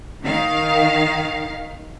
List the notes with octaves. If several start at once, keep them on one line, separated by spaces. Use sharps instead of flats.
D#3 F5